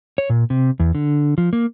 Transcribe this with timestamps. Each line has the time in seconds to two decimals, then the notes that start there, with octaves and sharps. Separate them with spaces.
0.18 C#5
0.30 A#2
0.50 C3
0.80 E2
0.95 D3
1.38 F3
1.53 A#3